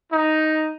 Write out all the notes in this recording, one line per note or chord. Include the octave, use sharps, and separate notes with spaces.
D#4